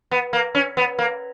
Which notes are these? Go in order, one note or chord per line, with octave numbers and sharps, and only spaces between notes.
B3
A#3
C#4
B3
A#3